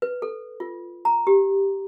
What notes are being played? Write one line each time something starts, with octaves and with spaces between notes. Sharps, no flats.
B4
A4
F4
A#5
G4